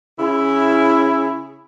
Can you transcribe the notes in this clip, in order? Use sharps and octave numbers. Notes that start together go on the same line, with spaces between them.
C#3 C#4 E4